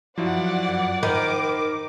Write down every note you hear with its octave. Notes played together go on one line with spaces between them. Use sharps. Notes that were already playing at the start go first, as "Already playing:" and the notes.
F#2 F3 F#3 E4 D5 F#5
D#3 A#4 C5 B5 D6